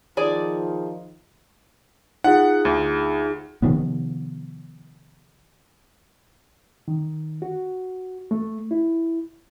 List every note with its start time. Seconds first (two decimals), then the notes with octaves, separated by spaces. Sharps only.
0.17 D#3 F3 G#4 D5
2.24 D#4 F4 G#4 F#5
2.65 D2
3.62 C3 D#3 F3 B3
6.88 D#3
7.42 F#4
8.31 A3
8.71 E4